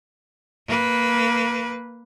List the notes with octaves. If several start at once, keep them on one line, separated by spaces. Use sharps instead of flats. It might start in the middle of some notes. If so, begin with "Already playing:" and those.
A#3 B4